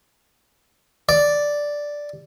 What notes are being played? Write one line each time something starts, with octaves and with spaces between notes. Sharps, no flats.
D5